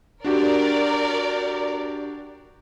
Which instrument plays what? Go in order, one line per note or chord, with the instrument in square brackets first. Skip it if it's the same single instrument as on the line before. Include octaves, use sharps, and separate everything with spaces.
[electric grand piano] D4 F#4 G4 [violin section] A#4 D5